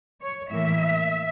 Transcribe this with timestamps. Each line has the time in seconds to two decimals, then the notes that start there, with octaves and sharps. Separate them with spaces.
0.21 C#5
0.50 A2 E3 A#3 E5